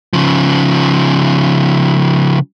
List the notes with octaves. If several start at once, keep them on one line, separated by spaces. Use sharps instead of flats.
C#3 F3